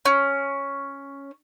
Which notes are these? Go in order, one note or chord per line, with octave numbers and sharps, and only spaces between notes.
C#4